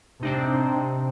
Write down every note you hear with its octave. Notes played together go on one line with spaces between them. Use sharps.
C3 C4 D4 D#4